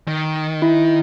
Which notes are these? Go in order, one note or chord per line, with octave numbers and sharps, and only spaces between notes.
D#3
E4